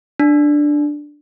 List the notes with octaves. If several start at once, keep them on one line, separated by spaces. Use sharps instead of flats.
D4